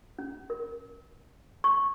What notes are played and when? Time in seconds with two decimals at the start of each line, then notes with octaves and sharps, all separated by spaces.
0.19 C#4
0.50 A#4
1.64 C#6